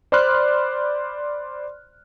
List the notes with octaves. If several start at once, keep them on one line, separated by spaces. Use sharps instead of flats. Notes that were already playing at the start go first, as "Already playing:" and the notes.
C5 D5 B5 C6 F6 F#6